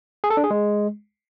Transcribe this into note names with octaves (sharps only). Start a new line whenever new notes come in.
G#4
A4
D4
G#4
G#3